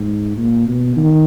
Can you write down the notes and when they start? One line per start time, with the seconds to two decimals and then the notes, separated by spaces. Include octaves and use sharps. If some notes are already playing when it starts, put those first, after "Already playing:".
Already playing: G#2
0.37 A#2
0.67 B2
0.97 D#3